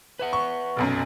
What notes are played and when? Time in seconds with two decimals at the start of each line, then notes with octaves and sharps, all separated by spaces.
0.19 B4 E5 F#5
0.33 C#6
0.76 F1 B1 F#2